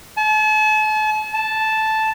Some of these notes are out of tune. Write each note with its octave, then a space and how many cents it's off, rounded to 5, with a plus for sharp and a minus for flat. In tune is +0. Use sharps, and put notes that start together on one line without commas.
A5 -40
A5 -5